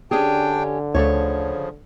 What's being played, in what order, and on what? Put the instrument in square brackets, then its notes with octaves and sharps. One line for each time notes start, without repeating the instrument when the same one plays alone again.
[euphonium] D3 [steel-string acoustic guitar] C#4 G4 [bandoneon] D4 G5 [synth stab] G#4
[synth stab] D2 A3 [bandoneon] C#3 F3 [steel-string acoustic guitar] C#5